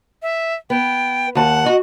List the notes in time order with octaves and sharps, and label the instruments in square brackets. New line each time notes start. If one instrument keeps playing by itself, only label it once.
[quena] E5
[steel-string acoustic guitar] B3 [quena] G5
[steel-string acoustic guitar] D#2 A5 [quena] F#5
[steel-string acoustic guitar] F#4 D#5